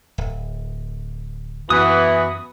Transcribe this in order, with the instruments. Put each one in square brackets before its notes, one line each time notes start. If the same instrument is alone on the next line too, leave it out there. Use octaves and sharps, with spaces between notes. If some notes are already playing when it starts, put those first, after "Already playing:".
[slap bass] D1
[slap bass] F#2 [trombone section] E3 [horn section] B3 F#4 B5 [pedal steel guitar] D#6